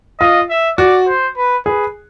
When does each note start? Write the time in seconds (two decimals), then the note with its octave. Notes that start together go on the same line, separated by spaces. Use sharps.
0.20 F4 D#5
0.50 E5
0.78 F#4 D5
1.07 C5
1.37 B4
1.66 G#4 B4